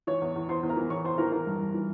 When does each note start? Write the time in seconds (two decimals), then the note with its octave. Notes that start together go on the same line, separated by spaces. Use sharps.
0.07 E3 C#5 C#6
0.22 E2
0.36 E2
0.49 E2 C5 C6
0.63 E2
0.69 A#4 A#5
0.76 E3
0.90 E2 C#5 C#6
1.04 E2 C5 C6
1.18 E3 A#4 A#5
1.32 E3 A#4 A#5
1.47 G2
1.61 G2
1.74 E3